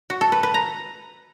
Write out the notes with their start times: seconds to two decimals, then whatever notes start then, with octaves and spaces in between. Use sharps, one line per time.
0.10 F#4
0.21 A4
0.32 B4
0.43 B4
0.54 A#5